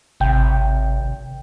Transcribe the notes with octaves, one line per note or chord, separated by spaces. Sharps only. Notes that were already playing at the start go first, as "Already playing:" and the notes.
G#1 C3 G5